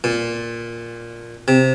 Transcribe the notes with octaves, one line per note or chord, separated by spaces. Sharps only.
A#2
C3